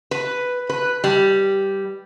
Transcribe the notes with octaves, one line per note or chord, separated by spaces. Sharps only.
B4
B4
G3